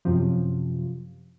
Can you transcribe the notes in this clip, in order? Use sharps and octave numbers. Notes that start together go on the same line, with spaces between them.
F#2 C3 F3